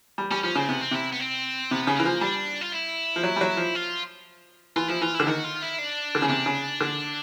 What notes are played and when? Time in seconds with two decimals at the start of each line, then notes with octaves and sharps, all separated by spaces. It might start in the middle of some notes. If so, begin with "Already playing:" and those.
0.18 G3
0.31 G3 C#4
0.43 F3 C#4
0.55 C#3 C4
0.68 C3 B3
0.82 C4
0.91 C3 E4
1.12 B3
1.20 C4
1.71 C3 B3
1.87 C#3
1.96 E3 A#3
2.05 F3
2.21 G3 D4
2.61 F4
2.72 E4
3.16 F3
3.23 F#3
3.36 G3
3.41 F#3
3.57 F3
3.75 F4
4.76 E3 F4
4.89 F3 E4
5.01 E3 F4
5.14 E4
5.20 D3
5.27 D#3 F#4
5.44 F4
5.62 E4
5.78 D4
6.15 D3
6.22 C#3
6.29 C3 D4
6.46 C#3
6.81 D3